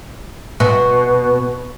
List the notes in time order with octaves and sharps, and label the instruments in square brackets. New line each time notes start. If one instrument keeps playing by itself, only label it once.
[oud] B2